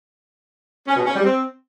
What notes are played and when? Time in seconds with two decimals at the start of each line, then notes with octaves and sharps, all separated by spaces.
0.87 C#4
0.96 B2
1.05 C#4
1.15 G3
1.24 C4